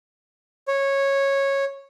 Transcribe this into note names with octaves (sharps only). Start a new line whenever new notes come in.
C#5